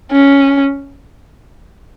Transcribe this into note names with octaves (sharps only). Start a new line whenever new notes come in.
C#4